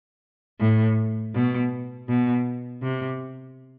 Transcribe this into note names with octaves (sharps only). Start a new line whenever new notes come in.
A2
B2
B2
C3